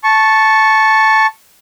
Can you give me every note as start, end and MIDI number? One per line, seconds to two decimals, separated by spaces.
0.04 1.27 81
0.04 1.27 85